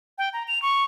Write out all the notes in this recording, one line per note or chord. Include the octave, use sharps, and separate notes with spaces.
G5
A#5
F7
C#6